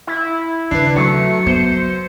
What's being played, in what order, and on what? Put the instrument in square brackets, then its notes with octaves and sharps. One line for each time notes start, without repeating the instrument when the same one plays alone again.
[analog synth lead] E4
[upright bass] D#2 C#3 [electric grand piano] D4 B4 [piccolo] C7
[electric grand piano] F#3 [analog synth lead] A3 [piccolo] C#7
[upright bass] B3 [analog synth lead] C5